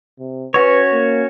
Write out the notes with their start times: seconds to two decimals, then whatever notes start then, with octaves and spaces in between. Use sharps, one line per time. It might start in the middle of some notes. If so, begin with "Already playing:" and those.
0.19 C3
0.54 C#4 F#4 B4 C#5
0.92 A#3